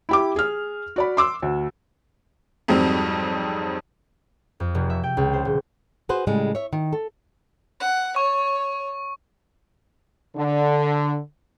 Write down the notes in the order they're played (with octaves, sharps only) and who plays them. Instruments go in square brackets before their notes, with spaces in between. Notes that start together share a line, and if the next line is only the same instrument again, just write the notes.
[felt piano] E4 G4 D6
G#4 F6
F#4 D5 B5
C6 D6 E6
D2
[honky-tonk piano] F2 G#2 F#3 G3 C4
[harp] F2
F1
E5
G5
C#2
C5
D#1
[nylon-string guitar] F#4 G#4 B4 C5
A2 C#3 G3 G#3
C#5 E5
D#3
A4
[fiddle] F#5
[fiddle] C#5 [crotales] C#6
[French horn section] D3